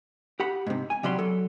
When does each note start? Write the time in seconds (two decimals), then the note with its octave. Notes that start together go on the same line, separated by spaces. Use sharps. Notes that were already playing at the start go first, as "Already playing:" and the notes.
0.40 G4 F#5 B5
0.67 G#2 C3
0.90 G#5
1.03 C3 F#3 G3 F#4 B5 C6
1.19 F#3 A4